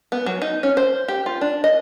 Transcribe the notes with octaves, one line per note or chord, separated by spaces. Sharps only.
B3
F#3
D#4
C#4
C5
G4
F4
D4
D#5